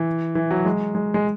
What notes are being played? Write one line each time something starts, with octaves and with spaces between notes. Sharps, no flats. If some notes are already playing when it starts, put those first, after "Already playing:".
Already playing: E3
E3
F#3
G#3
G#3
G#3